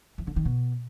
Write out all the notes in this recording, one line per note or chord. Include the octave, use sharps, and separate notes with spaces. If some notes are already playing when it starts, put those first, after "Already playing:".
E3
D3
D#3
B2